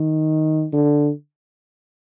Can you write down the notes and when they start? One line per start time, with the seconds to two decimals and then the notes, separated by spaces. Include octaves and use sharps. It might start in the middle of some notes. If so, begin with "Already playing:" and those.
Already playing: D#3
0.73 D3